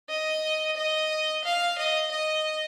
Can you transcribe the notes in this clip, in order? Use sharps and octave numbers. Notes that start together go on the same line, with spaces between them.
D#5
D#5
F5
D#5
D#5